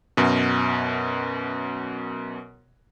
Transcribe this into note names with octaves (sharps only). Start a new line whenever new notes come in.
F#2 B2